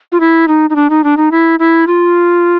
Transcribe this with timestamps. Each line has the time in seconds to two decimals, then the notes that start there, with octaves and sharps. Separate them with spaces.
0.12 F4
0.20 E4
0.48 D#4
0.70 D#4
0.76 D4
0.90 D#4
1.04 D4
1.17 D#4
1.31 E4
1.59 E4
1.87 F4